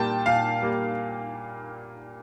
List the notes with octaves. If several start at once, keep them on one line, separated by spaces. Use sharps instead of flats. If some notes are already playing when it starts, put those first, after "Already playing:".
Already playing: A#2 G3 A#3 G5 A5
A#2 F5
G3 A#3